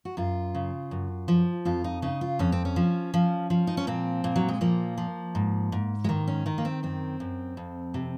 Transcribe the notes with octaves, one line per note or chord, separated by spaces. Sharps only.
F#4
F#2 F4
C#3
F#2
F3
F2 F4
D#4
C#3 D#4
F4
F2 C#4
C4
C#4
F3
F3
F3
D#4
C#4
A#2 C4
A#2
F#3
G#3
F3 A#3
F3
G#2
G#2
G#3
D#3 A#3
C#4
D#3 D#4
A#3
C4
F#2 C4
F#2
F2
C3